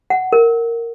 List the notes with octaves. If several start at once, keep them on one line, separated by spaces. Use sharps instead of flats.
F#5
A#4